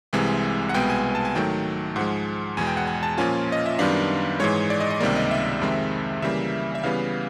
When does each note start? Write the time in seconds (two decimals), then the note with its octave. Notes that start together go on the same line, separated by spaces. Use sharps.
0.13 C2 C3 E3 G#3
0.69 F#5
0.74 C2 B2 G#3 B3 G5
0.90 G#5
1.15 A5
1.25 G#5
1.35 G#2 D#3 F#3 A3 G5
1.96 G#2 F3 G#3 F#5
2.57 E2 B2 G#3 G#5
2.67 G5
2.77 F#5
2.87 G#5
3.03 A5
3.18 A#2 F3 A#3 C#4 F4 G#5
3.52 D#5
3.66 E5
3.79 F#2 D#3 G3 B3 D4 F5
4.40 G#2 E3 G#3 C#5
4.70 D5
4.80 D#5
4.90 D#5
5.00 C#2 C3 D#3 G3 A#3 D5
5.16 D#5
5.31 E5
5.61 F2 C3 D#3 G#3 C4
6.22 C#3 E3 G3 A#3 E5
6.75 E5
6.83 C#3 E3 G3 B3 F5